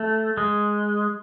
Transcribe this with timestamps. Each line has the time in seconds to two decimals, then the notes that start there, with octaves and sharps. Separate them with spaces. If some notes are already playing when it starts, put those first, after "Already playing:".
Already playing: A3
0.37 G#3